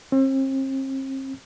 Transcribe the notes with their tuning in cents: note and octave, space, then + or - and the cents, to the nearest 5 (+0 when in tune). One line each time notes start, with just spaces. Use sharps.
C4 +40